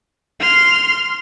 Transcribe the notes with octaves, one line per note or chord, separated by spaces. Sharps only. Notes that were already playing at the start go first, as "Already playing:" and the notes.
C6 F6